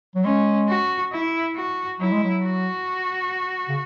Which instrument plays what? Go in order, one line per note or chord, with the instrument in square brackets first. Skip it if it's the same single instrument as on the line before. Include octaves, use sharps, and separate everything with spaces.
[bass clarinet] F#3
[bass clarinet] G#3 [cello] C#4
[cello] F#4
E4
F#4
[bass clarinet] F#3 [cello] E4
[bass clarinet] G#3
F#3
[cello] F#4
[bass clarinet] C#3